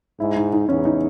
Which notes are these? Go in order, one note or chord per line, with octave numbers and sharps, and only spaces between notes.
G#2 E4
D#4
D#4
E2 C#4
D#4